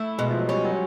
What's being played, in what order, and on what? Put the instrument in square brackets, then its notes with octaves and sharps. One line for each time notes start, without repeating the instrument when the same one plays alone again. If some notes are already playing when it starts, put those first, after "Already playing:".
Already playing: [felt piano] A3 [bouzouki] E4
[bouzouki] B2 [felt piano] G#3
[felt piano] F3
F#3
[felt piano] G3 [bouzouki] C#4
[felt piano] F#3